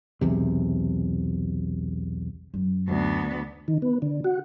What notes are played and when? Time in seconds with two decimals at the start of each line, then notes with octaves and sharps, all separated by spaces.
0.21 B1 E2 C3
2.54 F#2
2.88 D2 B3
3.68 D#3
3.82 B3
4.02 D3
4.24 F#4